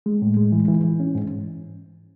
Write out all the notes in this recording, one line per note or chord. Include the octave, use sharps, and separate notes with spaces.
G#3
A2
G#3
E3
E3
E3
C#4
G#2